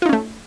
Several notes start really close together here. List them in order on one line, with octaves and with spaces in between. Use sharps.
F4 D#4 C#4 A3